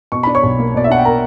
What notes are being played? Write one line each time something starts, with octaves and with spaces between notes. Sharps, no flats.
B2 C#6
D4 B5
C#5 C#6
B1
A#3
B2 D5
E5
D4 F#5
G5
A#4 A#5